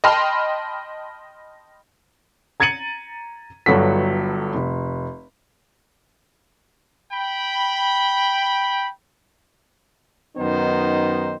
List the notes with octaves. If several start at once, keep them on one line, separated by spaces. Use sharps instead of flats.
D#5 G5 A5 B5 C6 F6
A#5 G#6 A6 C#7 D#7 F#7
G1 G2 F#3 F#4 A4 B6
F1
G5 B5
F#2 D#3 B3 D#4 C5